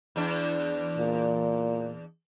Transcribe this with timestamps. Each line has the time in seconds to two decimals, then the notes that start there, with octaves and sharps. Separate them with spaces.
0.16 E2 D4
0.98 A#2